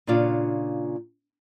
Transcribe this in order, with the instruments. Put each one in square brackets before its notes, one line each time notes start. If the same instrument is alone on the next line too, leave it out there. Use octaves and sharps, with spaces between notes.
[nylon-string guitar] A#2 C#3 D4 F4